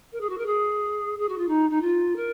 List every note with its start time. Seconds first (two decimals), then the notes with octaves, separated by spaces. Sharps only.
0.12 A#4
0.21 G#4
0.29 F#4
0.38 A#4
0.46 G#4
1.19 G#4
1.29 F#4
1.38 F4
1.48 D#4
1.70 D#4
1.81 F4
2.16 A#4